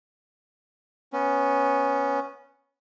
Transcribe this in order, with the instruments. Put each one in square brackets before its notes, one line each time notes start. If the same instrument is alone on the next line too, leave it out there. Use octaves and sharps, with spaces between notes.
[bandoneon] B3 C#4